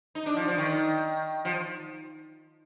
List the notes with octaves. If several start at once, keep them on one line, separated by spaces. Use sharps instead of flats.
D#4
D4
F3
F3
D#3
F3